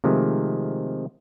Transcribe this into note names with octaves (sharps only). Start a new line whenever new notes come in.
C3 D#3 F3 G#3 A3